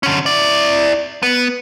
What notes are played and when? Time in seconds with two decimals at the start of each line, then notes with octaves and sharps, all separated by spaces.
0.03 D3 C#4
0.26 E4 D5
1.23 B3